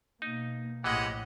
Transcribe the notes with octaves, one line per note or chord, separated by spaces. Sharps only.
B2 A#3 D#4
A#1 A2 E3 G#3 G4 D#5 F#5